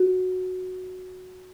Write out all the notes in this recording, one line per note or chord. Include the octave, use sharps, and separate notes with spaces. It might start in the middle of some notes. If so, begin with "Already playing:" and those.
Already playing: F#4